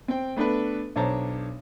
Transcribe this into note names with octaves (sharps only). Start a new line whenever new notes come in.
C4 G5
A3 B3 D4 A4 B4
B1 D4 C5 C#5 A5 A#5